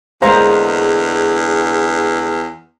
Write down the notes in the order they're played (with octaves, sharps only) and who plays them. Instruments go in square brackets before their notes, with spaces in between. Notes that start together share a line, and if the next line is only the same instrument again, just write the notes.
[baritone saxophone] E2 [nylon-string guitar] D3 G#3 A#3 [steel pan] C5 F5 A#5